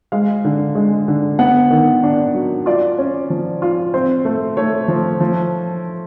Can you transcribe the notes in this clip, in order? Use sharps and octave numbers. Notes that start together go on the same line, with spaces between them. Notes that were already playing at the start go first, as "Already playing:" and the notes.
G#3 F5
D3
G#3
D3
B3 F#5
D#3
D4
F#3
F4 D5
C#4
F3
F4
C4 C5
A3
A3 C#5
F3
F3